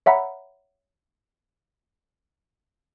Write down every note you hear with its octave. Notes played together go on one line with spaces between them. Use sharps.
C#5 E5 F#5 A#5 B5